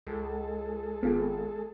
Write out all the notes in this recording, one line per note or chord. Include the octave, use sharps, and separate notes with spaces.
C#2 G#3 A4
G#1 B3 F4 G#4